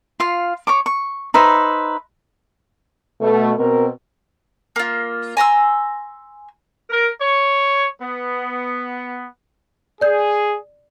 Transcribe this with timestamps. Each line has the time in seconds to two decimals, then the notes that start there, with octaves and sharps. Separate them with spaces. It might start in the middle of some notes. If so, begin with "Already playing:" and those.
0.20 F4 F5
0.67 C#5 C#6 D6
0.86 C#6
1.34 D#4 B4 C5 E5
3.22 B2 A3
3.58 B2 C4 A#4
4.76 A#3 F4
5.37 G#5 A#5 C6 E6
6.89 A#4
7.19 C#5
8.00 B3
10.01 G#4 D5 G6